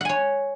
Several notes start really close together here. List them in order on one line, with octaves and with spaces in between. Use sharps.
F#5 G#5 C#5